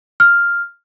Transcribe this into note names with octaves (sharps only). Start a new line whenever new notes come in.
F6